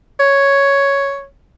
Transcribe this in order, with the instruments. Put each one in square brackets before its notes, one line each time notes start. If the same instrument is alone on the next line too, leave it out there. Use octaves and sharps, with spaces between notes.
[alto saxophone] C#5